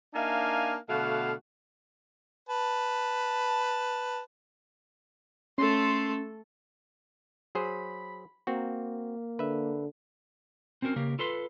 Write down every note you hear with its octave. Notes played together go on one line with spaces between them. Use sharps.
A#3 D4 D#4 E5 F5 G#5
B2 D3 A3 F#4 F5
B4 A5
A3 C#4 A4 C6
F#3 G#4 C5 B5
A#3 C4 F#4
D3 B4 E5
C4 C#4 F#4 A4 A#4
C#3 A#3 G4 A#4
F4 A4 B4 C6